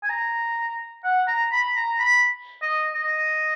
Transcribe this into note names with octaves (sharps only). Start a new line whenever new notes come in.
G#5
A#5
F#5
A#5
B5
A#5
B5
D#5
D#5